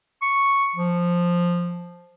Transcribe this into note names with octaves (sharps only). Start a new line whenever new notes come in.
C#6
F3